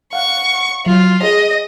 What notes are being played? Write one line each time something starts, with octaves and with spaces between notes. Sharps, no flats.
F5 F#5 C#6
F#3 F4
G#4 D#5